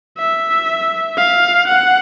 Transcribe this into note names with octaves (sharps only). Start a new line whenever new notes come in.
E5
F5
F#5